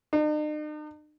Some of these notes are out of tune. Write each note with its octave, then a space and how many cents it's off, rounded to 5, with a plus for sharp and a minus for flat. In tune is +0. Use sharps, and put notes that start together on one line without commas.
D#4 -45